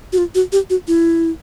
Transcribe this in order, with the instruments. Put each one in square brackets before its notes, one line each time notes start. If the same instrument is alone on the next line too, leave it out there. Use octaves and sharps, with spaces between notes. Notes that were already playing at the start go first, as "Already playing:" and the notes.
[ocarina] F#4
F4
F#4
G4
F#4
E4